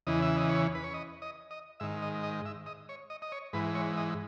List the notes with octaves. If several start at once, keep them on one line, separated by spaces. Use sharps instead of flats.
E2 C#3 E3 D#5
E5
D#5
C#5
B4
C#5
D#5
D#5
D#5
G#2 D#3 E5
D#5
D#5
E5
D#5
C#5
D#5
D#5
C#5
G#2 E3 B4
C#5
D#5